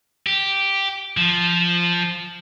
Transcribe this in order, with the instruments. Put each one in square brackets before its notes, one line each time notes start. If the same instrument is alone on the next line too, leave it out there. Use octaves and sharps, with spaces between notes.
[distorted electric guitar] G4
F3